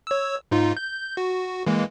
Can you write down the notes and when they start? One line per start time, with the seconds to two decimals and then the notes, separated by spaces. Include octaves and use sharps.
0.07 C#5 E6
0.51 G#2 D#4 F4
0.77 G6
1.17 F#4
1.66 E3 G#3 A#3